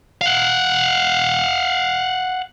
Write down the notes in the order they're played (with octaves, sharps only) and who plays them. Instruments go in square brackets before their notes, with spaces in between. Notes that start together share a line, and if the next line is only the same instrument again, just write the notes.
[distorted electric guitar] F5 F#5